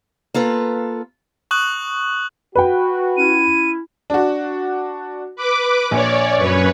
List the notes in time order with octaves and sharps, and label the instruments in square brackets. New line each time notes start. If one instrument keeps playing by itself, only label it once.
[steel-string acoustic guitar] A#3 F4 A4 B4
[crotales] C#6 D#6 F#6 F#7
[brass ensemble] F#4 [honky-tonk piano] B4 G5
[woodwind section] C#4 E4 [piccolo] D#7
[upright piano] D4 F#4
[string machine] B4 D6
[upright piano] A#1 [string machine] C#5 D5
[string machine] F#2 B4 C#5